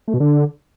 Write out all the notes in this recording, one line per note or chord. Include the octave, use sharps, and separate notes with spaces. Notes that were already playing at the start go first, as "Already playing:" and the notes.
A3
B2
D3